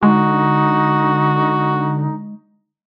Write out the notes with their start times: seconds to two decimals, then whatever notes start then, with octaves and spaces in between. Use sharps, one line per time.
0.03 D3 G#3 D#4 F#4